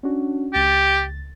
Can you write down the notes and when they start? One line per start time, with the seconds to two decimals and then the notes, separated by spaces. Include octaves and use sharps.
0.03 C#4 D4 F#4
0.54 C#2 G4 A6